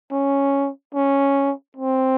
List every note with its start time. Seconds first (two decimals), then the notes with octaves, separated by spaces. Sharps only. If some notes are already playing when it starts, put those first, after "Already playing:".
0.12 C#4
0.95 C#4
1.77 C4